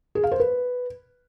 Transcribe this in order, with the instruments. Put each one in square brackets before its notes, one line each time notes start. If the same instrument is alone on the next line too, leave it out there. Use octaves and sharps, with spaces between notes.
[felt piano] G#4
F5
C5
B4